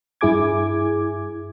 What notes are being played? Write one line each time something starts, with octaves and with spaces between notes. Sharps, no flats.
G2 E4 G#4 G#5 D6 G#6